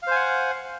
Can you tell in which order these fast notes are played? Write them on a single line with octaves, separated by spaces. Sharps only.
F5 C5 G#5 F#5